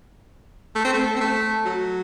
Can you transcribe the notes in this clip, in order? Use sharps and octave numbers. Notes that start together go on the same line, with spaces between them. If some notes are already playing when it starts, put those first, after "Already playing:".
A3
C4
A3
C4
A3
F#3